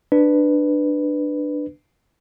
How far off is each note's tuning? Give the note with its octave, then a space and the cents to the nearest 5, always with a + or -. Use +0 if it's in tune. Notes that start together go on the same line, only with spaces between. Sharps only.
D4 +15 B4 +5